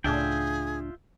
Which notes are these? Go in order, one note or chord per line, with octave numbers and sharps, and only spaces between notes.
C#2 A2 D4 F4 G#4 E5 G5